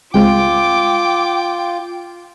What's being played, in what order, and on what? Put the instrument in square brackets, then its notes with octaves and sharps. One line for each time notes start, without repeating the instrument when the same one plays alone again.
[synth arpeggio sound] C#2 G#3 C4 [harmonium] F4 [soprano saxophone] G5 [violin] D6